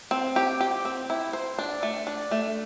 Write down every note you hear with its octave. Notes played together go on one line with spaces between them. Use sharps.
C4
G4
G4
C4
E4
C5
D4
A3
D4
A3